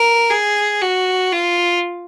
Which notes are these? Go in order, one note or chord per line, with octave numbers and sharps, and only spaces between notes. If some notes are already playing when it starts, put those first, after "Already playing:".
Already playing: A#4
G#4
F#4
F4